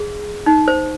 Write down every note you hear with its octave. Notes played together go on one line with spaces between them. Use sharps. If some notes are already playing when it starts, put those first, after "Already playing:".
Already playing: G#4
D#4
C5